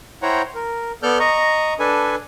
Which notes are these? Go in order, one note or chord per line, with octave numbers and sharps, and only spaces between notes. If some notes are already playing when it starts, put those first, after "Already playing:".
E4 C5 C#5 F#5 G5 A#5
A#4
B3 A4 D5 F6 G6
D#5 A#5 C#6
D4 A4 B4 G#5